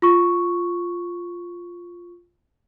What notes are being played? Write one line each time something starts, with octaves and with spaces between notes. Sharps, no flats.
F4 C#6